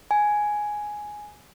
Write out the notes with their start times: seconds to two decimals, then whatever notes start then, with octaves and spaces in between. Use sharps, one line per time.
0.11 G#5